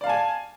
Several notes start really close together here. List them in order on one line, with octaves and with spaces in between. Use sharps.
D5 F5 A5 G#5